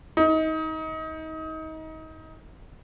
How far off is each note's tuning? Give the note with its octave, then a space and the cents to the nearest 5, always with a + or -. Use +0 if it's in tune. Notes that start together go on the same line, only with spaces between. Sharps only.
D#4 +25